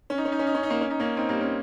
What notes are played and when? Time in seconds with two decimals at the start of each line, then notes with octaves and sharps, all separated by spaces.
0.10 C#4
0.18 D#4
0.25 C#4
0.32 D#4
0.39 C#4
0.47 D#4
0.55 C#4
0.63 D#4
0.70 A#3 C#4
0.81 C#4
0.90 D#4
1.00 A#3 C#4
1.17 C4 D#4
1.29 G3 A#3
1.41 A#3 C#4